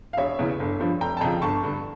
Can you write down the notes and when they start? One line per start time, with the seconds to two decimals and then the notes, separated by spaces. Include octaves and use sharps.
0.13 F5
0.17 E1 C#5 E5
0.39 E2 C#3 E3
0.60 G1
0.80 G2 F3
1.01 F1 G5 A#5
1.17 A5
1.21 F2 C#3 F3 G5 A#5
1.42 G1 A5 C#6
1.63 G2 D3